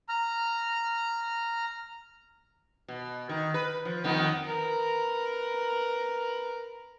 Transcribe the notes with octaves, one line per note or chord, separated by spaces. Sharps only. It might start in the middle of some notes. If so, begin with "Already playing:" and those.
A#5 F6
B2
D#3
B4
F3
F2 D#3 B3
A#4 B4